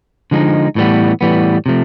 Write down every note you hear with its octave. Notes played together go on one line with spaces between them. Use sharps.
D3 F3 G#3 B3 D#4
A2 E3 G3 B3
A2 E3 G3 B3
C3 F3 A3